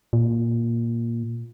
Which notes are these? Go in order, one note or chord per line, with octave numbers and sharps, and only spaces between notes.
A#2